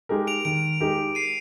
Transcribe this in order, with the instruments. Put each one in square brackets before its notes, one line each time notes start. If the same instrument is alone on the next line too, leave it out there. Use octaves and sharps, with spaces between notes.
[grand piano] G#3 D#4 G4 A#4
[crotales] D7 F7
[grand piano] D#3 [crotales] D7 F7
[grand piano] G#3 D#4 G4 A#4
[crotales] C7 D#7